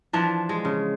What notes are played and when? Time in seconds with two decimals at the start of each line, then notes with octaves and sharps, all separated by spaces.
0.13 E3 F3 D4
0.49 G#3
0.65 C#3